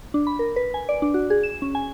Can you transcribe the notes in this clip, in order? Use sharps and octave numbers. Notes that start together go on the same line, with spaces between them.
D4
B5
A#4
B4
G#5
D5
D4
F#4
G#4
E7
C#4
G#5